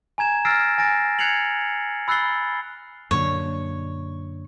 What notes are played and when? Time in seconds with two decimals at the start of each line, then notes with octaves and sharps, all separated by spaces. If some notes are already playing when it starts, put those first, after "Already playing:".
0.18 G#5 A#5 G#6 E7
0.45 E6 F6 A6 A#6 C7 D7
0.78 G#5 A6 A#6 D7
1.19 F#6 G#6 C7 C#7 F7 F#7
2.08 B5 E6 F#6 A6 C7 G7
3.11 F#2 A#2 D3 C#5